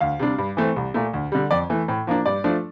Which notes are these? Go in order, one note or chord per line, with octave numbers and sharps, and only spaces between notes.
D2 F5
C3 G3 D4
G2
E3 A3 C4
C2
A#2 A3
D2
D3 G3
F2 D5
E3 A3
A2
F3 A#3 D4
G2 D5
F3 A3 D4